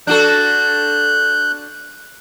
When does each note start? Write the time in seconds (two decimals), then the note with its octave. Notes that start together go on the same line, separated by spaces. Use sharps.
0.07 D4 F#4 A4 F#6 G6